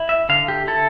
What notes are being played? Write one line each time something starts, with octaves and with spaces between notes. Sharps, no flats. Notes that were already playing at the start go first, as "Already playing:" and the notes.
Already playing: E4
E5
D3 F5
G4
E4 A4